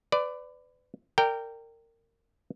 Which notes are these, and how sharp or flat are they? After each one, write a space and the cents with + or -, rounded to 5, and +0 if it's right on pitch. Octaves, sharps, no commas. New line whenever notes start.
B4 +30 D5 +0
A#4 -25 D5 +0 G5 +0